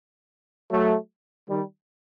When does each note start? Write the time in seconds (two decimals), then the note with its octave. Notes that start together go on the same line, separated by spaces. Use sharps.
0.71 F#3 A3
1.49 D#3 G3